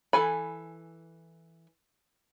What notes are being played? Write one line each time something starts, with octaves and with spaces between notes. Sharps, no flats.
E3 A4 G#5 B5